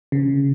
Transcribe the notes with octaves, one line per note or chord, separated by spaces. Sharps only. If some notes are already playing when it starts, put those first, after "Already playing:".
C#3